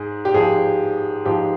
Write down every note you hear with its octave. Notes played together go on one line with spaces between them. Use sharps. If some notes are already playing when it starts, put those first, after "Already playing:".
Already playing: G#2 G#4
G4
G#2 F3 G#4
G#2 F3 G4